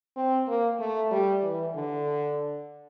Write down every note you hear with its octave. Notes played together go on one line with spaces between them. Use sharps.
C4
A#3
A3
G3
E3
D3